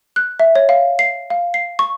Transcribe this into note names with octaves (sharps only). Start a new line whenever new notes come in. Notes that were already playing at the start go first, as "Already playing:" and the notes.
F#6
E5
C#5
F5
C7
F5
C7
C#6